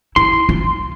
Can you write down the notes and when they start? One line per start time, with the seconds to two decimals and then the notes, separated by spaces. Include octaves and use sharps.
0.16 E4 C6
0.49 F4